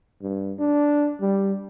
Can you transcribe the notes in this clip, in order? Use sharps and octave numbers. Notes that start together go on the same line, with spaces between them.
G2
D4
G3